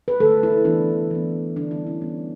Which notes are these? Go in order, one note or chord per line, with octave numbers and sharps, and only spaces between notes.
B4
D3 A3 A4
E4
E3 B3 D4
E3 B3
D3 G3 B3 D4
E4
C#4
E3 G3 B3